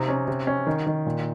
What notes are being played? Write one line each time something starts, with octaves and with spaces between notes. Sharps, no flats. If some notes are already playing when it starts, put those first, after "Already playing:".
Already playing: C3 D#4
C#4
C3
C#4
D#3
D#3
A#2